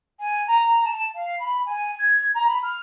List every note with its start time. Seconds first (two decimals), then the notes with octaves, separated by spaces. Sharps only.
0.19 G#5
0.47 A#5
0.84 A5
1.15 F5
1.39 B5
1.66 G#5
1.98 G#6
2.34 A#5
2.48 B5
2.63 F6